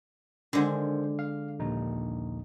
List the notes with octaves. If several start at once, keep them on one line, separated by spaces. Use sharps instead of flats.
D3 D#3 G#3 C5
F5
A#1 D#2 D#4